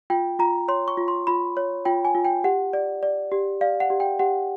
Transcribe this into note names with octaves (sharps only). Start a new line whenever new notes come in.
F4 G5
F4 A#5
C#5 C6
C#6
F4
C6
F4 B5
C#5
F4 G5
G#5
F4
G5
G4 F#5
D5
D5
G4
D5 F5
F#5
G4
G5
G4 F#5